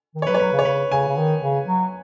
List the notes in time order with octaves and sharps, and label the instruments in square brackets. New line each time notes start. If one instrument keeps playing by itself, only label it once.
[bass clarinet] D#3
[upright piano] C#5
[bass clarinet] F#3 [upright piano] B4
[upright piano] C#5
[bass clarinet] F#3 [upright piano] B4
[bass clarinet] C#3
[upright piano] C#5
[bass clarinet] C#3 [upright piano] B4
[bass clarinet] C#3 [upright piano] G#5
[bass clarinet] C#3
D#3
C#3
F#3